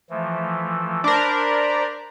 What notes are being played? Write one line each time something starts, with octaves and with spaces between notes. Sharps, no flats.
E3 F3 A3
D4 A#4 C5 D5 B5